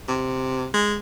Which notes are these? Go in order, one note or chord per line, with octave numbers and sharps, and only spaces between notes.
C3
G#3